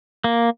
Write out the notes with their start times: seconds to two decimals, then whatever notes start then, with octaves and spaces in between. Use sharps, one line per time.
0.24 A#3